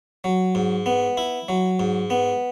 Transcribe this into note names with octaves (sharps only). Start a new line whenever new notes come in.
F#3
G#2
B3
E4
F#3
G#2
B3